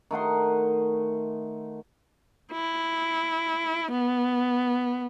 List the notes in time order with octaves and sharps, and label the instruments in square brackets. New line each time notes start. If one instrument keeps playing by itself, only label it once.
[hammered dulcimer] D#3 A3 F#5 C6
[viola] E4
B3